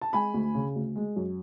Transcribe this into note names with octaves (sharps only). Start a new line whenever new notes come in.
A5
G#3 G#5 B5
D2
C#3
D2
G#3
F#2